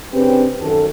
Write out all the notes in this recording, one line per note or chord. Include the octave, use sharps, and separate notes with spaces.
C#3 C4 D4 G4 B4
F#2 D#3 F#4 A4